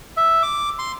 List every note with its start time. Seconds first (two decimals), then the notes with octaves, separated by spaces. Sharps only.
0.17 E5
0.43 D6
0.79 C6